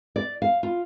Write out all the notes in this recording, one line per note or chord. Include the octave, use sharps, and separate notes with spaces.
D5
F5
F4